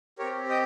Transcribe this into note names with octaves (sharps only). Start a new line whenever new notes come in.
C4 G4 A#4 C#5
D#5 G5